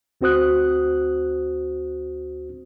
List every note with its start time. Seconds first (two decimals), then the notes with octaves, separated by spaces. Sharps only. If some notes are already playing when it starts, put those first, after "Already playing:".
0.21 D2 C4 F#4 C5 D#6 F#6